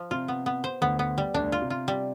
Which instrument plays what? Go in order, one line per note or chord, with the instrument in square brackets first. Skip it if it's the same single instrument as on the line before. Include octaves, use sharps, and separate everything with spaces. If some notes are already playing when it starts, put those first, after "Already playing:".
Already playing: [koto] F3
[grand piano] C3 [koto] F4
[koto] B3
B3
C5
[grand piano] D2 D3 [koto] B3
[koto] B3
G3
[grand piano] D2 D3 [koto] D4
[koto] F4
[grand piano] C3
[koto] F4
G3